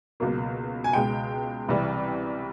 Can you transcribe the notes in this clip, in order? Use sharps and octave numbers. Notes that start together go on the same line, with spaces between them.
C#2 B2 F#3 A#3
G#5
C#2 B2 G#3 G5
C2 C3 E3 G3